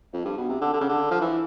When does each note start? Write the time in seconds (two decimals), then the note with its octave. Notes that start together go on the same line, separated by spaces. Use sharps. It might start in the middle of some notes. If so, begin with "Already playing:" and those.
0.13 F2
0.25 G2
0.37 B2
0.49 C3
0.61 D3
0.73 D3
0.81 C#3
0.89 D3
1.11 F3
1.21 E3